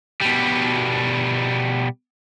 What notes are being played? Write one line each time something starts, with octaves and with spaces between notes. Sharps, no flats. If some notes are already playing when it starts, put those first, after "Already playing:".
B2 G3